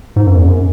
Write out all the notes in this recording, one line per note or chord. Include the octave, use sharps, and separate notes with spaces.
G#2
F#2
E2
F#2